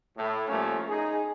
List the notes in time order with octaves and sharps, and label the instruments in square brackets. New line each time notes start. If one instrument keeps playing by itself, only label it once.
[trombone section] A2
F3 G3 A3 A#3 C#4
D#4 G#4